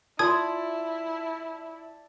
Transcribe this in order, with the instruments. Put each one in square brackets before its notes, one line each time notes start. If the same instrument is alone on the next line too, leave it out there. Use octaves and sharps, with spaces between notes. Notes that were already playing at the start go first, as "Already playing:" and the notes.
[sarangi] E4 [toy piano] F4 C6 [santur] D5 A5 [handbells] D#6 G#6